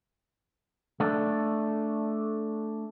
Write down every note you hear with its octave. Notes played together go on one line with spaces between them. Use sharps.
A3 D4